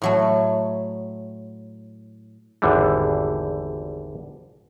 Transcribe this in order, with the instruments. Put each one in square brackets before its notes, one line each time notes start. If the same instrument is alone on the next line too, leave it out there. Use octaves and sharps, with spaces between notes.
[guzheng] A2 F#3 A3
[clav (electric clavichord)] G#1 E2 D3 E3 G3